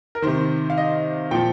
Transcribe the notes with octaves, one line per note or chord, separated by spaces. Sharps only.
A#4
C3 D#3 C5
F5
D#5
A#2 F3 G5